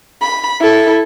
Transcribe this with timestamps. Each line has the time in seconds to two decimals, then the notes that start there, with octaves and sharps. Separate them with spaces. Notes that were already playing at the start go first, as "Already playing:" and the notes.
0.21 B5
0.60 E4 A4